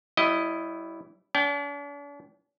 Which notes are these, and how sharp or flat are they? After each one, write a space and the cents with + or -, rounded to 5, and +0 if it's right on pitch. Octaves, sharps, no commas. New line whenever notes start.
G3 -45 E4 +0 D#5 +0
D4 -45 G5 +0